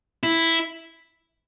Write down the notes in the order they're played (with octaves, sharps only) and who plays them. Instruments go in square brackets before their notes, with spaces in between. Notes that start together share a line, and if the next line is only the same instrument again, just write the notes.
[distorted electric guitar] E4